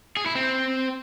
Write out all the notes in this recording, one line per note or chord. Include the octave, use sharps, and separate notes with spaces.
G#4
E4
C4